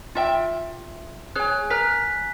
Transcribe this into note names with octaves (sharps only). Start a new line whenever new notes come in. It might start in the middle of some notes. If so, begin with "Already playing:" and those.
F4 E5 G5
G#4 C#5 G#5 F#6
A#4 A#5 F#6 B6